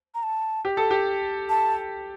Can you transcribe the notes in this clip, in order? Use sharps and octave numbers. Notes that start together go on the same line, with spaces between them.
A#5
A5
G4
A4
G4
A5